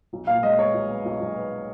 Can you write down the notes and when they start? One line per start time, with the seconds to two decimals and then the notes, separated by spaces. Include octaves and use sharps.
0.13 B1
0.27 A#2 F5
0.43 G#3 D#5
0.59 B3 C#5
0.74 B1
0.90 B3
1.05 B1
1.20 B1
1.36 B3